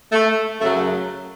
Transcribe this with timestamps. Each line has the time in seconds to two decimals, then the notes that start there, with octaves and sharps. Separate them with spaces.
0.12 A3
0.60 F#2 C#3 F#3 A3